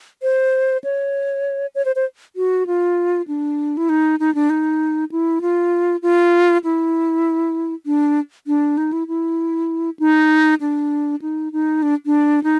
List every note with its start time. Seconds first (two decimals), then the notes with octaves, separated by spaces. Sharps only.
0.22 C5
0.84 C#5
1.75 C#5
1.85 C5
1.96 C5
2.36 F#4
2.67 F4
3.28 D4
3.77 E4
3.89 D#4
4.20 D#4
4.35 D4
4.50 D#4
5.12 E4
5.41 F4
6.03 F4
6.64 E4
7.86 D4
8.47 D4
8.78 D#4
8.93 E4
9.08 E4
9.99 D#4
10.61 D4
11.22 D#4
11.53 D#4
11.82 D4
12.06 D4
12.44 D#4